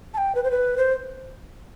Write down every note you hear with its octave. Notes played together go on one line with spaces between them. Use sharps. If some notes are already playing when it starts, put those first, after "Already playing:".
A5
G5
B4
C5
B4
C5